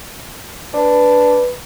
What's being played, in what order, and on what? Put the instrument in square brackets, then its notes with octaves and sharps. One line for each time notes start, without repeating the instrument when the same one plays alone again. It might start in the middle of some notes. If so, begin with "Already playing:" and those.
[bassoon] D4 [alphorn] B4